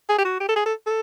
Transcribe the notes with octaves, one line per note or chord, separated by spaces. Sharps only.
G#4
G4
F#4
G4
A4
G#4
A4
A4